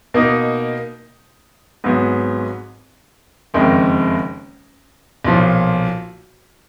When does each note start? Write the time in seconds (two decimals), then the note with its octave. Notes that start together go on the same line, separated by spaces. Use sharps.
0.14 B2 A#3 D#4
1.84 G#1 G#2 F#3 B3
3.54 F#1 F2 D#3 G#3
5.25 B1 A#2 F3